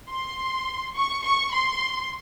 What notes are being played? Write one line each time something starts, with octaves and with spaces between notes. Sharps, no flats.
C6
C#6
C#6
C6